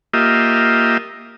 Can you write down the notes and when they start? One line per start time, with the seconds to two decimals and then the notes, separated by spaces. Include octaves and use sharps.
0.13 A#3 F4 G4 D#5 E5